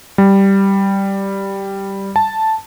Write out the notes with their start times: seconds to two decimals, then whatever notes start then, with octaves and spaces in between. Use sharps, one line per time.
0.18 G3
2.16 A5